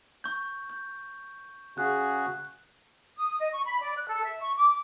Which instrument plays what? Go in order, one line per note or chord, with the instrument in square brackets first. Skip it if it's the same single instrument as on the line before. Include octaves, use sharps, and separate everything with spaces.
[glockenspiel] C#6 G6
G6
[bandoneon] C#3 F#4 G#4 [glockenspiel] F#6
[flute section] D#6
D#5
C#6
B5
D5
F#6
A4
E5
C#6
D6